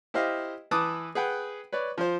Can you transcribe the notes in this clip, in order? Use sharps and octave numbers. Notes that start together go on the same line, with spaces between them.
E4 G4 C5 D#5 F5
E3 B4 A5 D6 D#6
G#4 B4 F#5 G5
B4 C#5 D5
F3 F4 C5